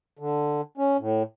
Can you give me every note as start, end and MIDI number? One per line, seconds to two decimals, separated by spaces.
0.19 0.61 50
0.77 0.97 61
0.99 1.23 45